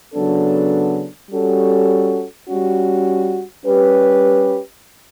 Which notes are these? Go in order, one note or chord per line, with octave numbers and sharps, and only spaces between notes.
C#3 F#3 B3 D4 A4
G3 C#4 F#4 A4
G3 C#4 F#4
G3 C#4 G4 B4